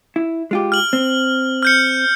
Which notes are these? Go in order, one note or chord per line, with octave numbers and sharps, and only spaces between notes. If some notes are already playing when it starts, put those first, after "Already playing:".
E4
G#3 F4 G4
F6 F#7
C4
F6 G6 C#7